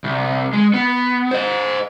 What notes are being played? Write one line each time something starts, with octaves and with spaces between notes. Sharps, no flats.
C2
G#3
B3
C5 D#5